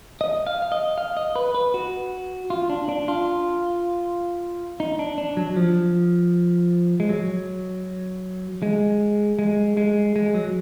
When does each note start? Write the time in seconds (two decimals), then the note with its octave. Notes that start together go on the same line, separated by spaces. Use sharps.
0.21 D#5
0.47 F5
0.62 F5
0.72 D#5
0.98 F5
1.17 D#5
1.36 B4
1.55 B4
1.74 F#4
2.50 F4
2.70 D4
2.89 D4
3.08 F4
4.80 D#4
4.99 D4
5.18 D4
5.37 F#3
5.56 F3
7.00 G#3
7.09 F#3
8.62 G#3
9.39 G#3
9.77 G#3
10.16 G#3
10.35 F#3